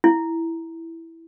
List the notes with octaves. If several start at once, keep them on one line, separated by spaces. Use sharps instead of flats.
E4